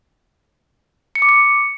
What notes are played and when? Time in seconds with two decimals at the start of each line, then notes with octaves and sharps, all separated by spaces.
1.15 C#7
1.22 D6
1.29 C#7